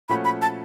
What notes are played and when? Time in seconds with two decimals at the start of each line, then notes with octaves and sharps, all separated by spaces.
0.09 A#2 F3 A3 C#4 F#4 B5
0.25 B5
0.42 A5